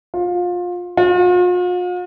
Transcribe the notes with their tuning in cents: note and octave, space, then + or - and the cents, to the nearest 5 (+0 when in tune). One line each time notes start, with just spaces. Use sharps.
F4 +25
F4 +45